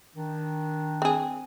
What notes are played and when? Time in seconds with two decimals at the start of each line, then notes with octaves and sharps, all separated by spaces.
0.16 D#3 D4
1.02 C4 G#4